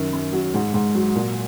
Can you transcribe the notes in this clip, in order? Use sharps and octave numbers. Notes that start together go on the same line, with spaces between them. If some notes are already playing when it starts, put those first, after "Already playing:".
Already playing: F#2 D#3
F#2
F#3
G#2
G#2
F#3
A#2